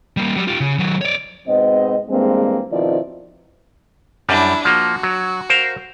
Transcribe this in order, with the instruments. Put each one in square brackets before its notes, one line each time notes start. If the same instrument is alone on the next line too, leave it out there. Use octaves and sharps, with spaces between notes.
[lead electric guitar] G3 A#3
F#3 G3
F4 G4
C#3
D#3 F#3
C#5 D5
[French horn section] G#2 B2 B3 C4 D#5
E2 G2 G#3 A#3 C4
B2 D#3 F3 C4 E4 D5
[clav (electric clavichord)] F#2 G3 [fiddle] D4 E4
[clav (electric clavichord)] F3 A#3 [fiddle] F#4
[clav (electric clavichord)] F#3
A#4 C5 F5